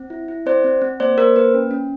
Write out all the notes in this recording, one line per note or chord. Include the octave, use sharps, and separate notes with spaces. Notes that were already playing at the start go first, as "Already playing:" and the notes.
Already playing: C4
E4
E4
C4 C5 D5
C4
C4
A#3 C5 D5
A#3 A#4 C5
A#3 B4
C#4
C#4